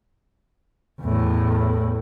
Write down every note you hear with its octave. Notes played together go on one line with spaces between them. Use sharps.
E2 A2